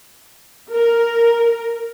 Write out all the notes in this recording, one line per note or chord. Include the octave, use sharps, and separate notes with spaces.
A#4